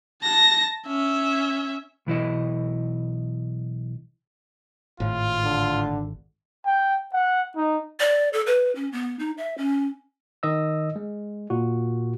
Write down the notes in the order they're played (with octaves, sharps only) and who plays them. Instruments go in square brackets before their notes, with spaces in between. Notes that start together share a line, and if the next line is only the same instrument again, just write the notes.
[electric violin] A5 A#6
C#4 E5
[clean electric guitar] B1 E3 E4 D#5
[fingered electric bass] G#1 [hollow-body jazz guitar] A2 [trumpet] F4
[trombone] D3
[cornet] G5
F#5
D#4
[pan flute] D5
A4
B4
C#4
B3
D#4
E5
C#4
[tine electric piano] D#3 D#5 E6
G#3
A#2 F#4